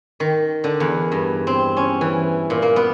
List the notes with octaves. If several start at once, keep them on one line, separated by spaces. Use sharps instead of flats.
D#3
D3
E2
G2
C4
C#4
E3
A#2
A#3
B3